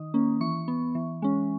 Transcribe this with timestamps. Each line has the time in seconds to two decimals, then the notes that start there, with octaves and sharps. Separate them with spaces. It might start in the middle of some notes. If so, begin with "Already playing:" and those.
Already playing: D#3 D#6
0.14 A#3 C#4
0.41 E3 C#6
0.68 B3
0.95 E3
1.22 G#3 C#4